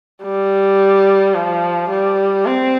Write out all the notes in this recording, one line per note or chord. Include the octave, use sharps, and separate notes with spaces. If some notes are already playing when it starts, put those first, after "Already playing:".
G3
F3
G3
C4